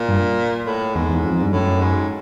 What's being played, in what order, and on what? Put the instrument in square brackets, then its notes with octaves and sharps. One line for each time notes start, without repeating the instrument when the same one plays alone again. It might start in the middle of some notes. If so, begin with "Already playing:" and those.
Already playing: [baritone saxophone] A#2
[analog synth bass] G2
[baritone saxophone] A2
[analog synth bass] E2 [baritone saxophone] G#2
[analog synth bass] E2
F2
G2
[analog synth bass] F#2 [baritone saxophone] A2
[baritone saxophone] G#2